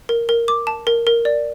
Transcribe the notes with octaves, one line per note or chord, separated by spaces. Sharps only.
A#4
A#4
D6
A5
A#4
A#4
D5